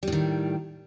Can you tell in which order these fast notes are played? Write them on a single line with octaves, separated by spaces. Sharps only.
G3 A2 D#3